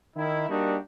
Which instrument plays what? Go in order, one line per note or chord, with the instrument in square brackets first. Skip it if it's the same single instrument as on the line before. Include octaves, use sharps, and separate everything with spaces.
[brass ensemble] D#3 E4
G3 A#3 D4 D#4 F#4 G4